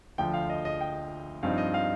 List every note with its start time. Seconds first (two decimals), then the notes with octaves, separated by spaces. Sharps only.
0.18 D2 D3 F3 G5
0.34 F5
0.50 D#5
0.65 D#5
0.81 G5
1.43 G2 F3 C4 D#4 F5
1.58 D#5
1.74 F5